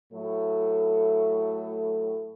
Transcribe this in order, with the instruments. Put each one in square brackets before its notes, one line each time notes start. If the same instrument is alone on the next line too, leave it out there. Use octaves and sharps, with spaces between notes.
[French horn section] A2 F#3 A3